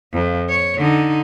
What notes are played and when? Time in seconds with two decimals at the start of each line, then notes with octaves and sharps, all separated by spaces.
0.13 F2
0.49 C#5
0.78 D3 D#4